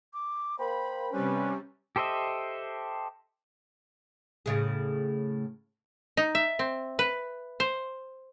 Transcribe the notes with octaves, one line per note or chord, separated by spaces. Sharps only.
D6
A#3 C5 G5 B5
G2 C3 G3 C#4 B4
G4 A4 C5 D#5 E5
A2 C#3 G#4
D#4
E5
C4
B4
C5